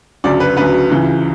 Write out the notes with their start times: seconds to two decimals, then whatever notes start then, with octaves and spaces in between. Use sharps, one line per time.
0.24 D2 C#3 F#3 D5
0.40 B4
0.56 D2 C#3 F#3 B4
0.90 C#2 C#3 E3